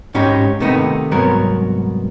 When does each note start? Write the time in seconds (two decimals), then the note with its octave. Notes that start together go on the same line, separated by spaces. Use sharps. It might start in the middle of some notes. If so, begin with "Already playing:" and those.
0.14 G#2 C#4 D#4 G4 C#5 B5
0.60 C3 D#3 A3 B3 C4 D#4
1.11 C2 G#2 F#3 B3 A#4 C#5